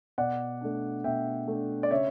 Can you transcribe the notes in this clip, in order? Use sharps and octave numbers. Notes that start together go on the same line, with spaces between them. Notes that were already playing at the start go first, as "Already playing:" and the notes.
B2 D5 F#5
A3 D4
B2 E5 G5
A3 D4
D5
C#3 C#5 E5